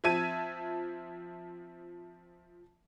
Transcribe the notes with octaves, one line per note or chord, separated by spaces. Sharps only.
F3 C4 E5 A5 G#6 D#7